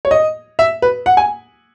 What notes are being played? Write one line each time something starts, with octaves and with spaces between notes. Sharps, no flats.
C#5
D#5
E5
B4
F#5
G#5